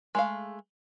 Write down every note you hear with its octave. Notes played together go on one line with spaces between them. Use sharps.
G#3 A3 F5